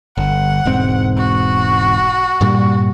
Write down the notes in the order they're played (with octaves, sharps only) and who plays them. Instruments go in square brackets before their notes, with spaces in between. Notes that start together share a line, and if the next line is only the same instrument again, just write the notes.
[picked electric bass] G1 [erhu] F#5
[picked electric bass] E1 G#2 C4
[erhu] F#4
[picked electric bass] G2 A#2 G3